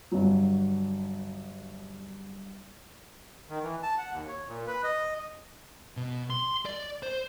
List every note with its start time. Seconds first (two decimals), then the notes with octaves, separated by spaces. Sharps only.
0.12 G1 F#3
3.50 D#3
3.63 E3
3.83 A5
3.98 F#5
4.11 D#2
4.28 C#5
4.48 A#2
4.67 B4
4.84 D#5
5.97 B2
6.30 C6
6.65 D5
7.03 C5